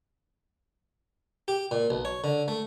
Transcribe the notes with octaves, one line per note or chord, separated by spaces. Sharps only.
G4
A#2
B1
C#5
D3
A3